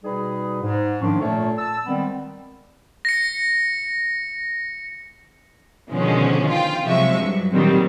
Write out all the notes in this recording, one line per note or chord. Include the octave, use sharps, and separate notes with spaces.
B2 G3 D#4 G#4 B4
G#2
D#3 F3 A#3 C#4 D4
A#2 A3 F4 A4 C#5
A5 E6
D#3 G3 G#3 B3 C4
A#6 C#7
B2 D3 D#3 F3 G#3 C#4
F4 G5
C3 F3 F#3 G#3 E5 C#6
G2 F#3
A#2 D3 D#3 F#3 G3 C4